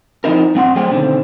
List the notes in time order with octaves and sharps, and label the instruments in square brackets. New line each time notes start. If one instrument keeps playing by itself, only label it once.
[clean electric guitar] F3 F#3 C4 D#4 E4 A#4
G2 C4 F#5 C6
F#3 A3 G#4 C5 G5 C6
B2 D3 D#3 C4